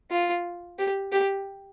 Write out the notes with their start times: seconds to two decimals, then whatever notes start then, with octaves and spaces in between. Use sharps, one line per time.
0.11 F4
0.79 G4
1.12 G4